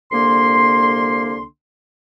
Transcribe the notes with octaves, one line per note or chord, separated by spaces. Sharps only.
C2 D3 A#3 C6